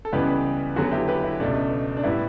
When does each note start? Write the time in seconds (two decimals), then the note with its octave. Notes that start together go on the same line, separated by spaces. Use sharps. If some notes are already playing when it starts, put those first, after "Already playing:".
0.05 A4
0.12 C#2 C#3 E3 G3 B3 G4 B4
0.76 E2 D3 F#3 B3 F#4 A4
0.92 E4 G4
1.08 G4 B4
1.24 E4
1.40 C#2 B2 A3 D4
1.97 D4
2.03 A2 G3 B3 E4